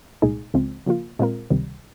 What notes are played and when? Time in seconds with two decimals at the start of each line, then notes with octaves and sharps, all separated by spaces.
0.22 C2 A#2 G#3 D#4 G#4
0.54 C#2 C#3 F3 G#3 C4
0.86 C#3 F3 A#3 F4
1.19 A#2 G#3 C4 F4 A#4
1.50 C#2 C3 D#3 G3